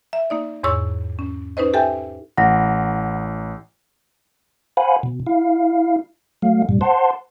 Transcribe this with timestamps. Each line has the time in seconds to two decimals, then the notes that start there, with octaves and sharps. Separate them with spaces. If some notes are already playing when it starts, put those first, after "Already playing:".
0.13 E5
0.30 A#3 D#4 D5
0.63 E2 G#2 C#5 C#6 E6
1.19 C#4
1.57 C#4 D#4 B4 C5 D#5
1.74 G4 A4 E5 G5 G#5
2.37 A1 F#5 A#6
4.77 C5 F5 F#5 G#5 B5
5.03 B2
5.27 E4 F5
6.42 F#3 A3 F5
6.69 G2 A#2 G3
6.81 C5 F#5 A5 C6